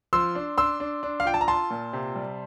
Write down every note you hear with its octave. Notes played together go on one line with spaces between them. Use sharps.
F3 C6 E6
D4
D4 C6 E6
D4
D4
F5
F4 G5
A5
A#5
F4 A5 C6
A#2
C3
G3